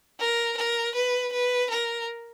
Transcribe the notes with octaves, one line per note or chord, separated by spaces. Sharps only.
A#4
A#4
B4
B4
A#4